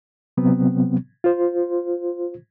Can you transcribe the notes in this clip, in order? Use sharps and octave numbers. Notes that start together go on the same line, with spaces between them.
C3 F#3 B3 C4
F4 C5